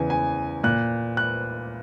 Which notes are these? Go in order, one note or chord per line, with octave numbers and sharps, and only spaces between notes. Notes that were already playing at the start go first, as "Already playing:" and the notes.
Already playing: E2 C#3 E3 G#5
G#5
A#2 F#6
F#6